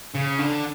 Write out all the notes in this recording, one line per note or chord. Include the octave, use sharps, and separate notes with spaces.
C#3
D3